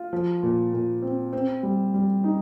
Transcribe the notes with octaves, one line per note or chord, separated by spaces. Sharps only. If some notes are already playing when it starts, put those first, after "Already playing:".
Already playing: F4
F3
A#2
A#2
C4
C4
G3
G3
D#4